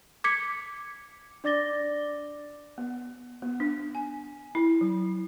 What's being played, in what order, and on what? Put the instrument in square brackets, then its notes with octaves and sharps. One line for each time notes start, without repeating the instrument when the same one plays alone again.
[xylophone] D6 G#6 B6 C#7
[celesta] D4 D5 D6 A6 A#6 G7
[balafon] B3
B3
D4
G#5
E4
F#3